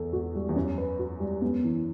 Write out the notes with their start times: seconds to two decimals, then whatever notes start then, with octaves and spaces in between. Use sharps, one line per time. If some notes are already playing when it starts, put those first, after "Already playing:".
Already playing: E2 A4
0.13 F#4
0.35 G3
0.49 E2
0.56 F#2 C#4
0.78 B4
0.99 F#4
1.20 G3
1.42 F#2 B3
1.64 E3